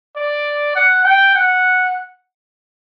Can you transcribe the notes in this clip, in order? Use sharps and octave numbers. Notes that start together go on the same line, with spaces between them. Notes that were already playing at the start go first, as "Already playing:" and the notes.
D5
F#5
G5
F#5